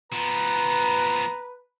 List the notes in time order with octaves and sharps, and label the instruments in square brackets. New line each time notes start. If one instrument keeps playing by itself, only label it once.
[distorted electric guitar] F3 B3 [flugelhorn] B4 [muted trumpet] A#5